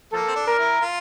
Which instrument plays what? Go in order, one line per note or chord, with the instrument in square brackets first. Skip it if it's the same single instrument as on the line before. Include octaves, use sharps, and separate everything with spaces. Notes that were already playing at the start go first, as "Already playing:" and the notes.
[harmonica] F3 A#3 [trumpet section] A4
[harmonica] C4
D4
[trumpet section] A#4
[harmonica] E4
F4